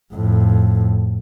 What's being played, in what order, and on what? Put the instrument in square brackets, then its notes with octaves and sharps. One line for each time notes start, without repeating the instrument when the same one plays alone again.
[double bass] F2 A2